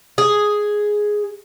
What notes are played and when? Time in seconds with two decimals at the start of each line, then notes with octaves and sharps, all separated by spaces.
0.18 G#4